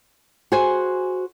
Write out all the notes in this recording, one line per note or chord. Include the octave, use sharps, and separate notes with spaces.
F#4 G#4 C5 G#5